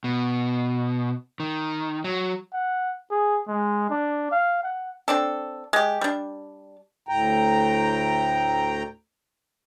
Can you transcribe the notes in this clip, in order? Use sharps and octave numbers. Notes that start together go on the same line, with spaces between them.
B2
D#3
F#3
F#5
G#4
G#3
D4
F5
F#5
C4 D4 A4
G#3 G4
G3 D4
D2 A2 G5 A#5